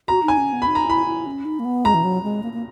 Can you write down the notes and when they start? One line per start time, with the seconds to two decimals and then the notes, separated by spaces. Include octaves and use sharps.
0.08 F#4 A#5
0.23 D#4
0.28 G#5
0.38 C#4
0.53 B3
0.62 B5
0.67 D#4
0.75 A#5
0.87 E4 B5
1.06 E4
1.26 C#4
1.45 D#4
1.59 A#3
1.65 B3
1.85 G#3 A#5
1.94 E3
2.04 F#3
2.23 G#3
2.43 A#3
2.53 A#3